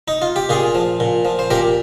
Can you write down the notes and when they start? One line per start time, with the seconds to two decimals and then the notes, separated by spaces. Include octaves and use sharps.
0.08 D#4
0.22 F4
0.36 G4
0.49 A#2 F4 G#4
0.75 F3
1.00 A#2
1.25 F3
1.39 C5
1.51 A#2 G4 A#4